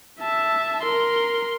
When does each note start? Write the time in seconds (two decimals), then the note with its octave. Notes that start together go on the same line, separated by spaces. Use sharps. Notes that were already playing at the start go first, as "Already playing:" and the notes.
0.21 E5 A5
0.83 A#4 C6